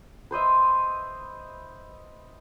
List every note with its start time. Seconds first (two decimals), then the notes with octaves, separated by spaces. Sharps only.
0.31 B4 C5 D#5 E5